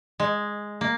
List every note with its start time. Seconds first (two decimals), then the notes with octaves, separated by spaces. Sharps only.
0.20 G#3
0.81 A#3